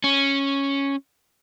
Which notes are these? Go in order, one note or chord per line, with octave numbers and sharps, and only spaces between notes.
C#4